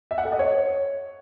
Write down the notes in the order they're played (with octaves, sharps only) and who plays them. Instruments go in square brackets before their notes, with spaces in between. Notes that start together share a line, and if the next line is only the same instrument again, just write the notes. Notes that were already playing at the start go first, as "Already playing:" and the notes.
[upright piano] E5
F#5
A4
D#5
C#5